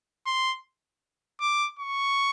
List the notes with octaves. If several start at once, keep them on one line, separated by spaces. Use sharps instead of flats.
C6
D6
C#6